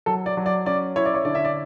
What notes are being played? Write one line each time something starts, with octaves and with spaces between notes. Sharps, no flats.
F#3 A4
D5
F#3
D5
C#4 D5
E4 C#5
D5
C#5
D3 D5
E5
D5